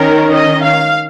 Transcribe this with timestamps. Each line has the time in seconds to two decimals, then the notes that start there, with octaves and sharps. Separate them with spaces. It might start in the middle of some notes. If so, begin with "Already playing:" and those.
Already playing: D#3 C#4 A#4
0.34 D#5
0.63 F5